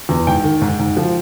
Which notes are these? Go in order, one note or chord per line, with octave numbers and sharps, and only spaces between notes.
E2
G#2 G5
D#3
G#2
G#2
F3